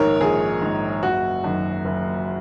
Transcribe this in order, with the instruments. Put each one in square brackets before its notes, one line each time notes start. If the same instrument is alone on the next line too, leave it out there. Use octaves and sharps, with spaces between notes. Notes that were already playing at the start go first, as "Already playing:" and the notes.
Already playing: [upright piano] A#1 G#2 D#3 A#4 C#5
A#1 G#4
G#2 D#3
F#1 F#4
F#2 D#3
F#1